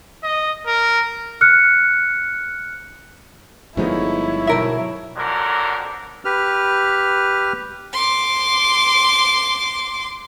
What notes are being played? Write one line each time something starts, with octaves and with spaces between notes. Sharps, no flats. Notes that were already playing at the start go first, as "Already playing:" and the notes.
D#5
A#4
F6 F#6 C#7
G1 F3 G#3 A3 B3 D#4 E4 C#5
B1 A#4 E5
F2 D3 F#3 A#4
G4 B4 F6
C6 D6